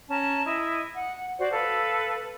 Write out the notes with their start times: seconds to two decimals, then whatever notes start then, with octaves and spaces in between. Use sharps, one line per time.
0.08 C#4 A5 A#5
0.45 E4 D#5 E5
0.94 F#5
1.38 F#4 C5 D5
1.53 A4 B4 F5